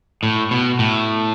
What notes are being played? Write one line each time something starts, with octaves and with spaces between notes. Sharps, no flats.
A2
B2
A2